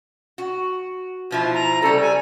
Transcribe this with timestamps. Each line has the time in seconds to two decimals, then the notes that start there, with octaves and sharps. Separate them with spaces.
0.38 F#4
1.31 B2 F3 E4
1.54 A#5
1.82 C#3 G3 A4
2.01 G#5